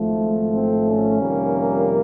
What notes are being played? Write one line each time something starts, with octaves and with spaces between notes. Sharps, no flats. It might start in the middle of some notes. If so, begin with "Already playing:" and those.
Already playing: G#1 G#2 F3 A3
C4
C#4
F2 C3 D#3 G3 A#3